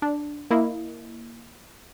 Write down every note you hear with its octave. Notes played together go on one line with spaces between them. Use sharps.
D4
A#3 E4 D#5